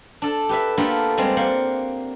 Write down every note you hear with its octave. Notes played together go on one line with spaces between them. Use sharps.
D4 A4
G4 B4 E5
A#3 B3 D4 F4 G4 A4
G3 G#3 C4
A#3 C5 F#5